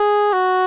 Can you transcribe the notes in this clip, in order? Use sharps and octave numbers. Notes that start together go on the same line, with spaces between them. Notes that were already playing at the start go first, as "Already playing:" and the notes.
Already playing: G#4
F#4